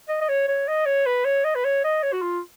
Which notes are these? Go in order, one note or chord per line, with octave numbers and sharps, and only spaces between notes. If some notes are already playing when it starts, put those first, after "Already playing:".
D#5
D#5
C#5
C#5
D#5
C#5
B4
C#5
D#5
B4
C#5
D#5
C#5
F#4
F4